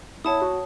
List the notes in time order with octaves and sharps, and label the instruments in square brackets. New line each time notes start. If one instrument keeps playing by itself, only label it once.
[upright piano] E4 [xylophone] C#5 F#5 A5 D#6
[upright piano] F#4